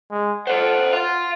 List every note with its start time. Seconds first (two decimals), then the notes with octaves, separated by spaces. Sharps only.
0.11 G#3
0.47 A4 C5 F#5
0.93 F5 C6